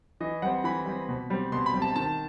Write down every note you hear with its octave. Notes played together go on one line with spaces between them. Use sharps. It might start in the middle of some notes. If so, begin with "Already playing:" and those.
E3 D#5
G3 C4 F#5
E3 B5
G3 C4
B2
G3 C4
B2 C6
B5
G3 C4
A5
D#3 A5